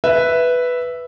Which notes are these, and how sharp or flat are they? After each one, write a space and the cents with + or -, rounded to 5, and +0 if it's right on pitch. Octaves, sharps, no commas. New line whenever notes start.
B4 +0 E5 +0